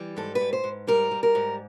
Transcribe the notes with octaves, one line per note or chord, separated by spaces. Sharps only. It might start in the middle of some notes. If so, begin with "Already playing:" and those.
Already playing: E3 G3
G#2 A4
B4
G#2
C5
G#2
G3 A#4
G3
A#4
G#2